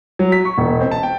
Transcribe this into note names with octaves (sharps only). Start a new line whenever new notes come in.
F#3
B6
C#6
E1
C4
A5
G5